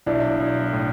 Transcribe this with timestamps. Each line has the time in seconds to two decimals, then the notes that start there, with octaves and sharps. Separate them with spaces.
0.06 B1 D4 E4
0.40 B1
0.73 A2